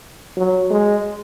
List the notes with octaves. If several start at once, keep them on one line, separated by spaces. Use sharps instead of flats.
F#3
G#3